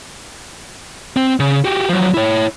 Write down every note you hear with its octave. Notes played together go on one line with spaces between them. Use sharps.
C4
C#3
F#4 G4
F3 F#3
E4 C#5